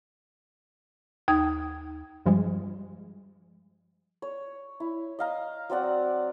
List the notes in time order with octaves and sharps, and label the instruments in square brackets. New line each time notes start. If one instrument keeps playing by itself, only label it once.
[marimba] D#2 D#4 D#6 G#6
[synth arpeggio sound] G2 F3 G3 G#3
[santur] C#5
E4
D#5 F5 A#5
F#3 C4 D5 F#5